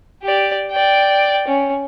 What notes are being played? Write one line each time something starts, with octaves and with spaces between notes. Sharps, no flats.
G4 D5
D5 G5
C#4